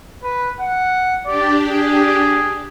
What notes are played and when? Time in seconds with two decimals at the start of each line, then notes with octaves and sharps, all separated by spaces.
0.23 B4
0.60 F#5
1.26 D4 G4 D5
1.66 G#4